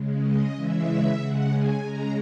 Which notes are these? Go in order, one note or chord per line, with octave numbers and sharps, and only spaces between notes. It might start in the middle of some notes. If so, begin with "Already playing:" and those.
Already playing: C#3 G#3
D#5
C#3 E3 G#3 E5
C#3 G#3 F#5
G#5
C#3 G#3 A#5